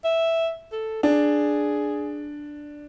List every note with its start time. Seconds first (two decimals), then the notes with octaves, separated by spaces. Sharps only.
0.04 E5
0.72 A4
1.03 D4 G#4